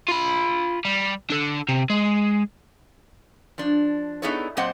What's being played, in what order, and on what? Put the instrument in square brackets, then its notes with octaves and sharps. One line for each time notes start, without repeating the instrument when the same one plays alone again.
[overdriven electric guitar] F4 B5
G3
D4 A4
C3
G#3
[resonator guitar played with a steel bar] F3 D4
B3 D#4 E4 G#4 A4 C#5
A#2 F#3 C4 C5 D#5 F#5